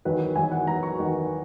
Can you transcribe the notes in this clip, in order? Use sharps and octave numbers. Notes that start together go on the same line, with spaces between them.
E2 D#3 F#3 B4
E2 D#3 F#3 G#5
F#5
E2 D#3 F#3 A#5
C#6
E2 D#3 F#3